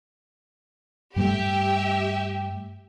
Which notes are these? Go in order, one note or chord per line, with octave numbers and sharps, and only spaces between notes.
G2 G3 A3 G4 E5